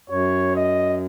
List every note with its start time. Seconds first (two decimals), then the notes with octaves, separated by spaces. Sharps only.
0.10 F#2 C#5
0.56 D#5